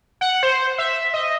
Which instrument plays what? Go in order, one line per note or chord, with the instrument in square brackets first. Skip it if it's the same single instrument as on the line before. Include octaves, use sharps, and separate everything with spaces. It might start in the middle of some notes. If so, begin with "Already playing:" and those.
[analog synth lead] F#5
C5
E5
D#5